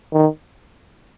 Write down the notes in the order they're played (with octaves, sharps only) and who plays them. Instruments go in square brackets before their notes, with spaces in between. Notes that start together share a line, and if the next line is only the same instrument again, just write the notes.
[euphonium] D#3